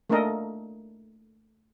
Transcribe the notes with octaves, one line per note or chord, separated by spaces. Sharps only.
A3 A#3 D4 A4 A#4 D#5